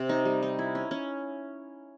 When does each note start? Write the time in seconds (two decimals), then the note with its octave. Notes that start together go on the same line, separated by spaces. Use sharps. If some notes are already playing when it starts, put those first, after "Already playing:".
Already playing: C3 C4
0.09 D#4
0.25 G3
0.43 D#4
0.59 E4
0.75 C#4
0.91 C#4